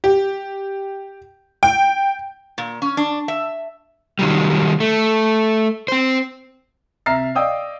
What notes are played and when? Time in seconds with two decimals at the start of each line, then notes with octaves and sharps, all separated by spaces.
0.04 G4
1.63 G5
2.58 A#2
2.82 C#4
2.97 D4
3.28 E5
4.19 D#3 F#3 G3
4.80 A3
5.88 C4 C5
7.06 C3 E5 A#5 F6 A6 C7
7.35 D5 D#5 F5 G5 D#6 E6